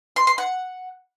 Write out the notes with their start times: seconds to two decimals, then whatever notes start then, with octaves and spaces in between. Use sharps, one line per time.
0.16 C6
0.27 C6
0.38 F#5